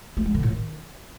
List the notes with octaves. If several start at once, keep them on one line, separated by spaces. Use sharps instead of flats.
A3
G#3
D3
A2
D#3